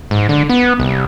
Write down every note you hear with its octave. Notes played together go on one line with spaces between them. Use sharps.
G#2
D3
B3
C2